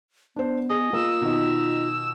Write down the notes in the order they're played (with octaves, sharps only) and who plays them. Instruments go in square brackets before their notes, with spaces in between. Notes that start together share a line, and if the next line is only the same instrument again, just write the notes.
[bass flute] B3 [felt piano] D4 C5
[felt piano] G#4 [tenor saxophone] D#5
[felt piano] A#3 [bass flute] F4 [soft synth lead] E6
[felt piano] B2 D#3 D#5 [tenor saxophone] D#4